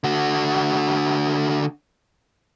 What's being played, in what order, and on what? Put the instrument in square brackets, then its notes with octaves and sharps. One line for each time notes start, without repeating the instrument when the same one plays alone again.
[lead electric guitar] D3 F#4